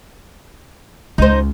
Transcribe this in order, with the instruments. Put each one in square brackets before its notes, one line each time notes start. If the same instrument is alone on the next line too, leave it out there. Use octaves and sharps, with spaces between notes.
[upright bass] C#2 [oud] D#4 C5